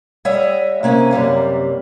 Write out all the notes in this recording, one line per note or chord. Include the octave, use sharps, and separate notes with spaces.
G3 C#5 D#5 E5 F#5
C3 A#3 C#4 D5 D#5
F#2 C3 G3 A#3